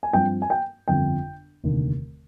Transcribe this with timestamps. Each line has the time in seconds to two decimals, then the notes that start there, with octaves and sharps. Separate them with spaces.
0.03 G#5
0.13 G2 F3 C4 G5
0.42 G#5
0.50 G5
0.88 G1 F2 D3 G5
1.64 F1 D#2 D3